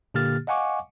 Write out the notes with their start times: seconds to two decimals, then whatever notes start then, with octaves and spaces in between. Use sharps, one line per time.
0.14 A#2 D3 A#3 G4 F6 A6
0.47 D#5 F5 F#5 G#5 C#6 D6